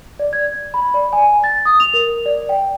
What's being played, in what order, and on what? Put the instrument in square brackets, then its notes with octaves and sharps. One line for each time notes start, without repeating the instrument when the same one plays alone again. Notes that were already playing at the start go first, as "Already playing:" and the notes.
[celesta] D5
G#6
B5
D5
G#5
A6
D#6
F7
A#4
D5
G5